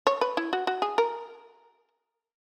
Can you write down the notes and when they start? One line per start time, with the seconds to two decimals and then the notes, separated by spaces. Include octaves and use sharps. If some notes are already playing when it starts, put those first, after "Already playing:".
0.07 C#5
0.21 B4
0.37 E4
0.53 F#4
0.67 F#4
0.82 G#4
0.98 A#4